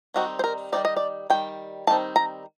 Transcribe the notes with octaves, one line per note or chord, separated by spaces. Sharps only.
D#3 G3 C4 D#4 F#4
C5
A#4
D#3 G3 C4 D#4 D5
D#5
D5
D#3 G3 G5
D#3 G3 C4 D#4 A5
A#5